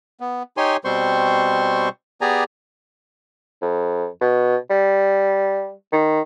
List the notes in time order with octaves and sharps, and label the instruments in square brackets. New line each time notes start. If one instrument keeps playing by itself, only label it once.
[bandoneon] B3
D#4 G4 C#5 G#5 C6
B2 G3 C4 C5 C6 C#6
B3 G4 G#4 D5 G#5 A#5
[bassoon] F2
B2
G3
D#3